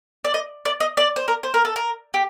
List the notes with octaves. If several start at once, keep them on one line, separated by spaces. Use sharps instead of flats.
D5
D#5
D5
D#5
D5
C5
A#4
C5
A#4
A4
A#4
G4